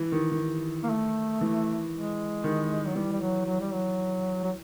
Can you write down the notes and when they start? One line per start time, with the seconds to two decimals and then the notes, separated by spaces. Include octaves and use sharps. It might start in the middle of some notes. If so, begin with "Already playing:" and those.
Already playing: E3
0.12 D#3
0.32 D#3
0.83 A#3
0.90 A3
1.41 E3
1.93 G#3
2.44 D#3
2.86 F#3
2.95 E3 G3
3.13 G3
3.20 F#3
3.46 F#3
3.61 G3
3.73 F#3
4.44 F#3